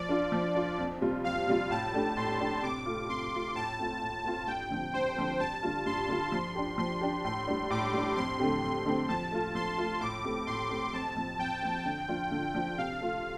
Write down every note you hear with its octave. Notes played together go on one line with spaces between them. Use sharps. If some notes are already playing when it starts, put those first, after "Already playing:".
Already playing: F3 D5
D4 F4
F3
D4 F4
F2
C3 G3 F4
F2 F5
C3 G3 F4
A2 A5
A3 D4 G4
A2 C6
A3 D4 G4
C3 D6
A3 F4
C3 C6
A3 F4
A2 A5
A3 C4 F4
A2
A3 C4 F4
G2 G5
D3 F3 C4
G2 C5
D3 F3 C4
G2 A5
D3 G3 F4
G2 C6
D3 G3 F4
F3 C6
D4 G4
F3 C6
D4 G4
A2 C6
G3 D4
A2 D6
G3 D4
F2 C6
D3 A3 C4 G4
F2 C6
D3 A3 C4 G4
F3 A5
A3 F4
F3 C6
A3 F4
A2 D6
A3 C4 G4
A2 C6
A3 C4 G4
F2 A5
F3 C4
F2 G5
F3 C4
D3
F3 D4 F4
D3
F3 D4 F4
C3 F5
A3 F4